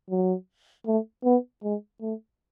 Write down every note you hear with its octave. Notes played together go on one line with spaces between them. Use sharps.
F#3
A3
B3
G#3
A3